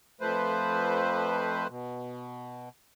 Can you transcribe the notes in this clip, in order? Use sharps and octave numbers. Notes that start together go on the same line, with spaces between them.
F2 F3 A3 B4 C5
B2